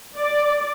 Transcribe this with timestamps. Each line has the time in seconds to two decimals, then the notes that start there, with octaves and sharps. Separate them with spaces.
0.17 D5